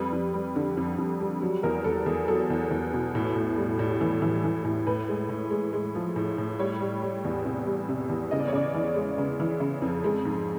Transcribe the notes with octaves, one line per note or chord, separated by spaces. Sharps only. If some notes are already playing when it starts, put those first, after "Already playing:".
Already playing: F2 G3 B4
F2
G3
D3
F2
F2
G3
F#3
E2 A#4
E2 A4
E2 G#4
F#3 A4
E2
E2
B2
A2
A2
G3
A2
E3
E3
E3
A2
A2 B4
G#3
A2
G#3
G#3
F3
A2
A2
G3 C#5
G3
G3
E2
C3
G3
C3
E2
C#3 D#5
D5
C#5
C#3 D5
E3
G#3
C#3
E3
C#3
F2
G#3
G#2